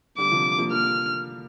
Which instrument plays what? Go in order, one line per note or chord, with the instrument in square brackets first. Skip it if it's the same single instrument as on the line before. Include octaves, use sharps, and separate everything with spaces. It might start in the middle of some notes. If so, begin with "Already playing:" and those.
[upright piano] D3 G3 [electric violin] D6
[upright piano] C3 F3
F3 A#3
[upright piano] F3 A#3 [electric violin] F6